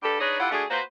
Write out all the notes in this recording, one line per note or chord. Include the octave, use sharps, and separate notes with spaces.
G2 G4 A4
D4 D#4 G#4 B4 C#5 D#5
E4 F4 G4 A4 F#5
A3 D4 F#4 G#4
A#3 F#4 B4 C5